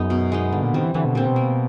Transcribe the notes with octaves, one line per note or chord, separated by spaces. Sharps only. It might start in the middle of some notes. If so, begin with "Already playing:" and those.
Already playing: F#2 G#3 B3 D#4
B2
G#3 B3 D#4
G2 D3
A#2
D#3 G3 C4
E3
D3 E3
B2
A#2 G3 C4
B2
A#3